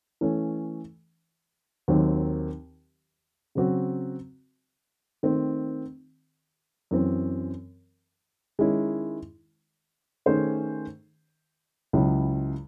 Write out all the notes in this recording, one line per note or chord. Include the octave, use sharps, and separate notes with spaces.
E3 A3 C#4
D#2 D#3 F#3 C4
C#3 F#3 C4 F#4
D#3 A3 C4
F#2 E3 C4
D#3 G#3 C#4 E4
D#3 A3 C#4 G#4 C5
C#2 C#3 F#3 C#4 E4